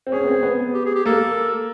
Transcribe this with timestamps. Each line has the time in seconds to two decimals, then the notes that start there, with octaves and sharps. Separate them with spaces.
0.07 C4
0.11 C#4 G#4
0.24 B3
0.27 C4
0.43 B3
0.74 G4
0.85 G#4
0.95 G4
1.06 A#3 A4